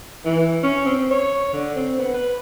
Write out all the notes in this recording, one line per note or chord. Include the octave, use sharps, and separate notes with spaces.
E3
C#4
C4
C#5
D3
C4
B3
B4